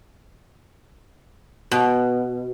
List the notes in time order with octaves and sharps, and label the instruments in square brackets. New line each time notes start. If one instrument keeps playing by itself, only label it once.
[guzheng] B2